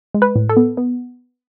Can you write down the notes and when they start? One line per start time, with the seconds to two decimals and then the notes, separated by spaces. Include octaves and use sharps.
0.14 G#3
0.22 B4
0.36 A2
0.49 A4
0.57 B3
0.77 B3